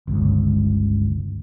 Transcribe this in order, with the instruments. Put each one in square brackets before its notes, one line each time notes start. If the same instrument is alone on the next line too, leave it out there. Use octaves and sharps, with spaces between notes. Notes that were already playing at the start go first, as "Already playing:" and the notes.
[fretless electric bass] G1 C#2